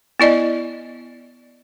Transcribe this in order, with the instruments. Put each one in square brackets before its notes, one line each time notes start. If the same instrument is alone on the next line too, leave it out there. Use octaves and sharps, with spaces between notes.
[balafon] B3 E4 D5 D#5